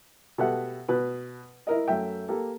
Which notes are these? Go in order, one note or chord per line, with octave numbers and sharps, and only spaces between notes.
B2 G4 A4 E5 F#5
B2 B4
E4 A#4 D#5
F#2 A3 E5 G5
A#3 G4 A4